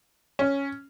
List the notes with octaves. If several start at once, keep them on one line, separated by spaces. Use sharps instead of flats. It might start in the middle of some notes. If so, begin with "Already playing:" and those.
C#4